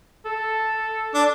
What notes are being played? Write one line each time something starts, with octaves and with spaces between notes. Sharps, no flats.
A4
D4